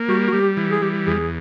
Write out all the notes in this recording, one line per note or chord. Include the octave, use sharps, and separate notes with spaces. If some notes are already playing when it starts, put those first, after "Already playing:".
Already playing: A#3
G3 F#4
F#4
G3 G4
E3
G#4
G3 G4
E2 G#4